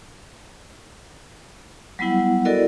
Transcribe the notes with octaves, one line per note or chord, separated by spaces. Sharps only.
F#3 G3 B3 E4 F#5
E4 F#4 A4 A#4 D5 D#5